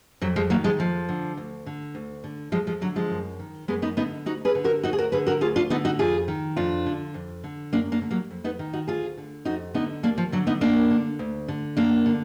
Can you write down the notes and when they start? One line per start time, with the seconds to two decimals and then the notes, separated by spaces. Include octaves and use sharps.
0.21 F2 F#3
0.36 F3 G#3
0.50 D#3 F#3 A#3
0.64 F3 G#3
0.79 F2 F3
1.09 D3
1.37 D2
1.66 D3
1.95 D2
2.24 D3
2.52 F2 F3 G#3
2.67 F3 G#3
2.81 D3 F#3
2.96 F3 G#3
3.10 F#2
3.40 D#3
3.68 F#2 G#3 B3
3.82 B3 D#4
3.97 D3 B3 D#4
4.26 D2 D#4 F#4
4.45 G#4 B4
4.55 D3
4.64 F#4 A#4
4.83 D2 D#4 F#4
4.93 G#4
4.98 F#4 A#4
5.12 D3 G#4 B4
5.27 F#4 A#4
5.41 D2 F4 G#4
5.56 D4 F4
5.70 D3 B3 D#4
5.85 D#4 F#4
5.99 F2 F4 G#4
6.28 D#3
6.56 F2 D4 F4
6.86 D3
7.14 F2
7.44 D3
7.73 F#2 A#3 D4
7.92 A#3 D4
8.01 D3
8.10 F#3 A#3
8.31 F2
8.44 B3 D#4
8.59 D#3
8.73 D#4 F#4
8.88 D2 F4 G#4
9.18 D3
9.45 F2 D#4 F#4
9.74 D3 B3 D#4
10.03 D#2 A#3 D4
10.18 F3
10.32 D3 F#3
10.47 B3 D#4
10.61 F#2 A#3 D4
10.90 D3
11.19 D2
11.48 D3
11.77 F#2 A#3 D4
12.06 D3